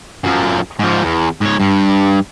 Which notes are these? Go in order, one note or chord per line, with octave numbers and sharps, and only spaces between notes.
F#2 F3
G#2 F3
E2
G#2 C#5
G2